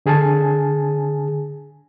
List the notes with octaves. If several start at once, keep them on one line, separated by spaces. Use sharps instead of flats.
D3 G#4 G#5 A5